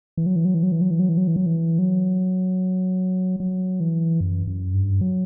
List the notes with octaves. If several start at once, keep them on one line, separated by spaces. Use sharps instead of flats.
E3
F#3
E3
F#3
E3
F#3
E3
F#3
E3
F#3
E3
F#3
E3
F#3
E3
F#3
F#3
E3
F#2
F#2
G2
F#3